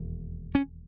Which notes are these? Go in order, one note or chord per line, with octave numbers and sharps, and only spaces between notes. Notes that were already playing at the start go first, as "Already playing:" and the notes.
Already playing: E1 D#2
C#4